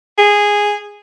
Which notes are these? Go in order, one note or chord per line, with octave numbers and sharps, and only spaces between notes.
G#4